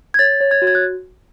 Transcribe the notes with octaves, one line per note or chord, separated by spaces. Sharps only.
G#6
C#5 A6
C#5
G#6
F#4
G#6
F#6